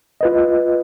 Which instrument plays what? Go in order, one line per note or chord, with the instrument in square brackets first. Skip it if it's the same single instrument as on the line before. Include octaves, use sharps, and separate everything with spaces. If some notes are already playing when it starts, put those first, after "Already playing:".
[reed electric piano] F4 B4 D#5